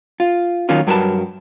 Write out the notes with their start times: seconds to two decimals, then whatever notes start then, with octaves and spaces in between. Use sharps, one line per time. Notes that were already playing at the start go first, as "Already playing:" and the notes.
0.20 F4
0.69 D#3 F#3 A#3 C#4 F4
0.87 G2 F#3 A#4 B4 A5